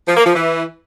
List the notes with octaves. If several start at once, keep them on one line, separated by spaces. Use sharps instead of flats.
F3
A#3
F3
E3